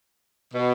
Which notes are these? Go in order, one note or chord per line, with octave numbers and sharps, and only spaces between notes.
B2